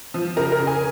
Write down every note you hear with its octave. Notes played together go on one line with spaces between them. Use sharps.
F3
C#3 A#4
A#4
C#3
G#5